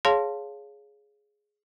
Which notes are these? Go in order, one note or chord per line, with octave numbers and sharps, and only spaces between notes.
G#4 C#5 F5 A5 C6